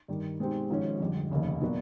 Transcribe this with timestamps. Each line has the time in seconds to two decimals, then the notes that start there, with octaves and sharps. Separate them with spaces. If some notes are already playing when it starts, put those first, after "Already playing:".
0.08 G2 D#3 G3
0.39 B2 G#3 C4 D#4 G4
0.69 G#1 G#2 F3 G#3 C#4
1.00 F2 D3 G3
1.31 F1 D#2 C#3
1.61 A#2 F#3 B3 D4 F#4